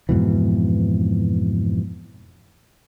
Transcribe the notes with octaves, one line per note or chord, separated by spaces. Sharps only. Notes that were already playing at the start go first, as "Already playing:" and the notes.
F2 G#2 B2 E3